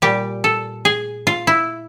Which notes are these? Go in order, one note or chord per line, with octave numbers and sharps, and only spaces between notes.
A#2 G3 G4
A4
G#4
F4
E4